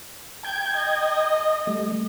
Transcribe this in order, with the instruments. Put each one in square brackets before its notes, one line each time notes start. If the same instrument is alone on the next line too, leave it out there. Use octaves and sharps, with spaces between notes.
[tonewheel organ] G5 G#6 [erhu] G6
[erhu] D#5
[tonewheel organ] G3 A3